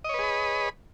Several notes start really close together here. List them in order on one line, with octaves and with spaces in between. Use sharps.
D#5 C#5 B4 G#4 B5